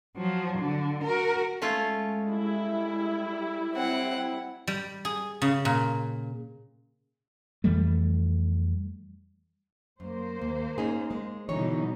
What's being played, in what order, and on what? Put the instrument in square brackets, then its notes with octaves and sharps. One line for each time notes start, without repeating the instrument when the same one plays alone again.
[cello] F3 F#3
D3
F#4 A#4
[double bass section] G#3 [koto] A3 C#4 F4
[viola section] G3 E4
[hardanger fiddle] C4 F#5
[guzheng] G3
G#4
C#3
A#2
[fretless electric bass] F2 E3 G3 A3
[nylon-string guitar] F#2 [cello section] A#3 C5
[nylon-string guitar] D#2
C#4 D#4 G#4
G#3
[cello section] B2 G3 D#4 [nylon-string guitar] D3 E3 C#5